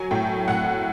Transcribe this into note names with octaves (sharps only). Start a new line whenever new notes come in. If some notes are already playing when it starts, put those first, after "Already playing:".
Already playing: F#3 G#5
A2 G5
A2 F#5